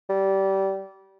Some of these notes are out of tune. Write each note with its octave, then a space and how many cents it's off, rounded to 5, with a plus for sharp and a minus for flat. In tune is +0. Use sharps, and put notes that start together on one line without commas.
G3 -20